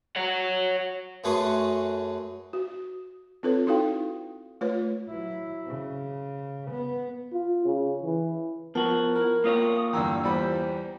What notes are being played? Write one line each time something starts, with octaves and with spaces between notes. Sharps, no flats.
C#5 F#5
F#2 A3 G#4 B4 C6 C#6
F#4
C4 F4 A4 B4 C#5
D#4 E4 F#4 A4 F5 G5
A3 F4 B4 C#5
F#3 E4
C#3
B3
F4
C#3
E3
F3 B3 F#4 A#4 A5
E4 A#4
A#3 F4 C#5 D#6
E2 G2 D3 G5 A#5 E6
E2 G3 C5 B5